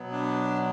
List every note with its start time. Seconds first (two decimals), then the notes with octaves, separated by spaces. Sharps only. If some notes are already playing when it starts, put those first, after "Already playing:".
Already playing: B2 F#3 B3
0.12 D4